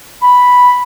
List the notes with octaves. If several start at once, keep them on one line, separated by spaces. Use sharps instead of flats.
B5